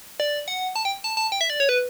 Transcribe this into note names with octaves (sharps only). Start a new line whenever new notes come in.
D5
F#5
A5
G5
A5
A5
G5
E5
D5
C#5
B4